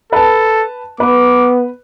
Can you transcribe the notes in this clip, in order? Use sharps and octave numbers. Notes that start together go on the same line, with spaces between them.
A4 B4 A5
B3 B4 D6